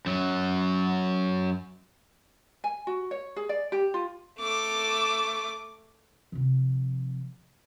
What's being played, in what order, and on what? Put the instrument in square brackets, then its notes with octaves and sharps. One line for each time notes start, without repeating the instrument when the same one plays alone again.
[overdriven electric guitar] F#2 F#3
[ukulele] G#5
F#4
C#5
G#4
D5
G4
F4
[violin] A3 D6
[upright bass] C3 F3